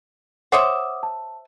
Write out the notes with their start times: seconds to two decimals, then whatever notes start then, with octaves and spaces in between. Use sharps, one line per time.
0.52 C5 C#5 E5 F#5 D6 D#6
1.03 A5